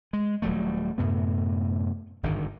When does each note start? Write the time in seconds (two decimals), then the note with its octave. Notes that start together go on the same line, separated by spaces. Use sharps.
0.13 G#3
0.42 D#1 F#3 G3 A3
0.98 F#2 A2 C3 B3
2.23 G#1 G2 D3 D#3